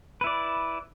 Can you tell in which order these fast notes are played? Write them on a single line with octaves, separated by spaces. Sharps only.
B4 E4 D5